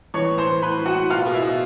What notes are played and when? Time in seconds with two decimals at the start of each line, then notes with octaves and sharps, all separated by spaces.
0.14 E3 C#5 C#6
0.30 A2
0.38 C5 C6
0.47 E3
0.62 A2 B4 B5
0.78 E3
0.86 F#4 F#5
0.94 A2
1.10 B2 F4 F5
1.26 B2
1.34 E4 E5
1.42 B2